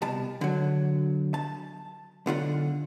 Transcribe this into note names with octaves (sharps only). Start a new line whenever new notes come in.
C2 B2 A5
D3 F#3
A5
B1 D3 F4 F#5